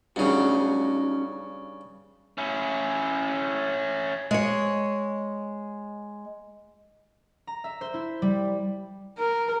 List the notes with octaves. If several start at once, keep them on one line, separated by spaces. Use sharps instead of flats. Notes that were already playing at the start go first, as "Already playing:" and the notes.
G2 C#3 C#4 D#4 F#4
C#4 E4
G#3 C#5
A#5
E5
C5
E4
G3
A#4